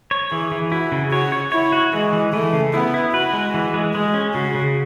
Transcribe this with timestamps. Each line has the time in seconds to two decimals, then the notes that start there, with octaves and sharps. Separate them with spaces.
0.11 C#5
0.31 E3 G#4
0.52 E3
0.71 E4 F#4
0.92 C#3
1.12 F#4 C#5
1.32 C#5
1.52 E4 C#5
1.72 F#4
1.93 E3 G#3
2.13 E3
2.33 E3 A3
2.53 C#3
2.73 B3 E4
2.94 E4
3.13 F#4 B4
3.33 G#3
3.54 E3
3.74 G#3
3.94 G#3 G#4
4.14 C#4
4.34 C#3 F#4
4.55 C#3